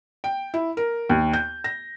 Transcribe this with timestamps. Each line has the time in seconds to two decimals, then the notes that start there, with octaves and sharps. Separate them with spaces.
0.24 G5
0.54 E4
0.77 A#4
1.09 D#2
1.33 G6
1.64 A#6